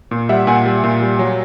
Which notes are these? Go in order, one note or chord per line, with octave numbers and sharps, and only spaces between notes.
A#2
G3 E5 F#5
A#2 F#5 G#5
G3
A#2
G3
F#3